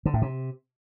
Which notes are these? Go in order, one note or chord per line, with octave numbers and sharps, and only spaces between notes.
D3
A2
C3